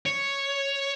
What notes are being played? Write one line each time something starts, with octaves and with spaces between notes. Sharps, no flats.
C#5